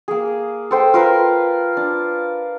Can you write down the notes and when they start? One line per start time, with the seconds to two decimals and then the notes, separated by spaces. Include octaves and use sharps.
0.08 A#3 G#4
0.71 A4 C5 G5
0.94 F4 A#4 B4
1.77 D4